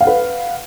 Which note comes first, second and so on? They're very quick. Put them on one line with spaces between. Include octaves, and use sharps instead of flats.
F5 F#5 B4